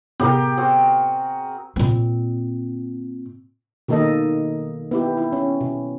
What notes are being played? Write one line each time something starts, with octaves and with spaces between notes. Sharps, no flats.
A2 C3 B3 G4 G#4 A#4
C4 F#4 G#4
A#2 C4
B2 D#3 A#3 D#4 A4 D#5
B3 E4 G4
E4
C#4
B2